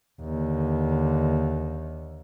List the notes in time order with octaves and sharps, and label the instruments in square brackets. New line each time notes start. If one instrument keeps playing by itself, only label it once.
[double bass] D#2 D3